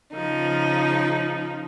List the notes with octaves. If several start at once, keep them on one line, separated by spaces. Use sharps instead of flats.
C#3 F3 D#4